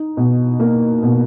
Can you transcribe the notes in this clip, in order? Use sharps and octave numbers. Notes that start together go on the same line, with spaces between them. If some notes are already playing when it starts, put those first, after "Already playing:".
Already playing: D#4
B2
A#3
B2